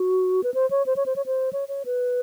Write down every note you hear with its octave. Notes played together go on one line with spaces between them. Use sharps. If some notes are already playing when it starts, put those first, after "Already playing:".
Already playing: F#4
B4
C5
C#5
C5
C#5
C5
C#5
C5
C#5
C#5
B4